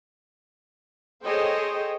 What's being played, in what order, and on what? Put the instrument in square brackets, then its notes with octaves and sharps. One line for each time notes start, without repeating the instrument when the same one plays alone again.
[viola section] G#4 A4 C5 C#5 D#5 G5